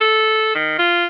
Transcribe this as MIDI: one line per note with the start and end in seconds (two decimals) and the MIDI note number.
0.01 0.53 69
0.55 0.76 51
0.79 1.06 65